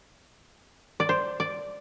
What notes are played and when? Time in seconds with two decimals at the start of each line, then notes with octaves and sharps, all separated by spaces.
1.00 D5
1.09 C5
1.40 D5